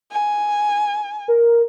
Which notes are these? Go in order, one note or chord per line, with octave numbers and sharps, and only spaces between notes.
G#5
A#4